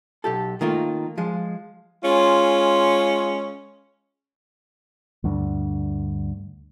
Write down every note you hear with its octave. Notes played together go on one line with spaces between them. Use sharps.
B1 G4 A4
D#3 A3 A#3 F4 A#4
F3 G#3
G#3 C#4 F4
D2 G2 D3